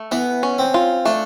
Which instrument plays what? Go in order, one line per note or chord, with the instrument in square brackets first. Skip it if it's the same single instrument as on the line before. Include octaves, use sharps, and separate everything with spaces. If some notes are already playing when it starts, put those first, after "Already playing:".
Already playing: [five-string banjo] A3
[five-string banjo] E3 [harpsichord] B3
[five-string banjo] C#4
[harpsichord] C4
[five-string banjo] F4
[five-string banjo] A3 [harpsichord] D4